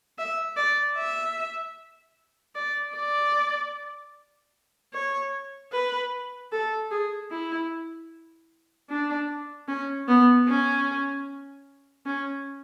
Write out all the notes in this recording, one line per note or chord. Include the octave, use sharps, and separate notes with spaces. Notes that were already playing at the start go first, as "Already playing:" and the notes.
E5
D5
E5
D5
D5
C#5
B4
A4
G#4
E4
D4
C#4
B3
C#4
C#4